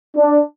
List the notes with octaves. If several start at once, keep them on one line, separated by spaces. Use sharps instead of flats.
D4